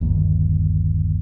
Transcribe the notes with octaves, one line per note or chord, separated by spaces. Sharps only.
G1 D#2